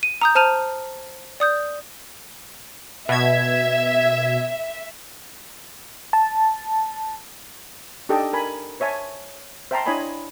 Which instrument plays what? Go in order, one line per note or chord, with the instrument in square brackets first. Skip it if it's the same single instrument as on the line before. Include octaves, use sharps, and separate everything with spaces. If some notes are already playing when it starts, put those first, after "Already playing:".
[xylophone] D#7
A#5 D#6 G6
C5 A5 F6 D#7 F7
D5 D#6 G6
[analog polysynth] B2 G#6 [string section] E5
[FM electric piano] A5
[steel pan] D4 D#4 G4 A4 D#5 G5
A#4 G#5 B5
C5 C#5 E5 G#5 A5 C#6
C5 E5 G5 A5 A#5 C6
D4 E4 C#5 D#5 G#5 B5